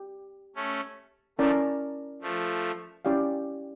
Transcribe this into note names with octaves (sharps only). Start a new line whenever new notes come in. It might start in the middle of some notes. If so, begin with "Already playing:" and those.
Already playing: G4
A3 C#4
F3 A3 C#4 E4 A#4 D5 A5
F3 A3
C#4 E4 G4 D5 F5